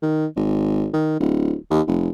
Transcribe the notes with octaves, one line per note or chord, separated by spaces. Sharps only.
D#3
G#1
D#3
D1
D#2
F1